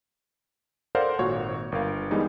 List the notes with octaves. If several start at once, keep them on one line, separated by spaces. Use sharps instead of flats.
A4 A#4 C5 D5 F5 F#5
G#1 A#2 F#4 C#5
G1 A#4 F5
E3 G3 G#3 B3 D#4